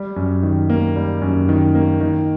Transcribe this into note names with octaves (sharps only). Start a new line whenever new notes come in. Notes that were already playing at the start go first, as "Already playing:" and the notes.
Already playing: G3
F#2
D#3
A#3
G3
F#2
D#3
A#3
D#3